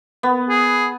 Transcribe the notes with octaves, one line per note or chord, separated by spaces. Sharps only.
B3
G#4